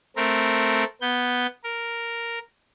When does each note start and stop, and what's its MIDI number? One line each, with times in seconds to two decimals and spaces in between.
0.16 0.84 57
0.16 0.84 60
0.16 0.84 70
1.01 1.47 59
1.01 1.47 91
1.64 2.39 70